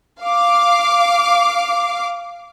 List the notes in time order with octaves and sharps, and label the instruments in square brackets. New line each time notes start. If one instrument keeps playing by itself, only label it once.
[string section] F5 D6